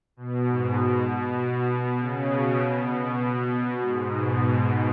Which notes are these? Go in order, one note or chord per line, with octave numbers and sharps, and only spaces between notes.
B2
G#2
B2
B2
C#3
B2
B2
G#2
B2